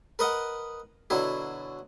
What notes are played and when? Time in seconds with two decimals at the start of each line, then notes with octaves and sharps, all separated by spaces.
0.19 A#4 B4 D#5 F#5
1.10 B2 D3 F#3 E4